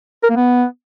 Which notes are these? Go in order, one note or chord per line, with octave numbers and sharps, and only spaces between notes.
A#4
A#3
B3